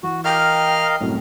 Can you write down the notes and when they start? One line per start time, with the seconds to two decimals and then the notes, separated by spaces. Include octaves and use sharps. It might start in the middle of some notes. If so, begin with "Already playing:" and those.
0.03 E3 F#4
0.25 A#4 D#5 F5 G5 F6
1.00 C2 F#2 A2